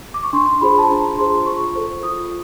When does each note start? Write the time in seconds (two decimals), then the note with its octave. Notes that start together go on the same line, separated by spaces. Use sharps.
0.14 D6
0.23 C#6
0.33 D4 C6
0.61 F4 G#4 C5 B5
0.78 A5
0.90 D4 A#5
1.18 F4 G#4 C5 C6
1.46 F4 C#6
1.75 A4 C5
2.03 F4 D#6